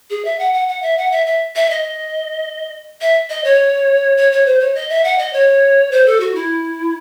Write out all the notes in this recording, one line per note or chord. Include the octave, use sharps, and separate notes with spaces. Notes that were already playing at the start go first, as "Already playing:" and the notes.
G#4
E5
F#5
F#5
F#5
E5
F#5
E5
E5
E5
D#5
E5
D#5
C#5
C#5
C#5
C5
C#5
D#5
E5
F#5
D#5
C#5
C5
A4
F#4
E4